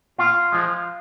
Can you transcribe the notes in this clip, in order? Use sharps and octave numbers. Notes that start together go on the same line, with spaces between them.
A#2 F4
F3 G#3